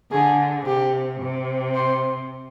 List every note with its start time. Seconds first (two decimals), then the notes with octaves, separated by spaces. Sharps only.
0.11 D3 G#4
0.66 C3 G4
1.21 C3
1.75 C5